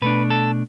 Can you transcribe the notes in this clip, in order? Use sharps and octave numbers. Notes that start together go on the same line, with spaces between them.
B2 A3 D4 B4
A4